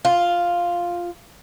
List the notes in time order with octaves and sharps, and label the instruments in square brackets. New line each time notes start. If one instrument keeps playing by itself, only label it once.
[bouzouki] F4